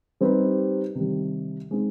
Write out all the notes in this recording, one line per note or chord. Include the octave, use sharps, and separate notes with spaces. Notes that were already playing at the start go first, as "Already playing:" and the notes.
G3 C4 D#4 G4 B4
C3 D#3 G3
G#3 C4 D#4